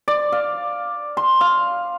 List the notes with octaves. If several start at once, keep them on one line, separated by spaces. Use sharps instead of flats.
D5
F5
C6
F5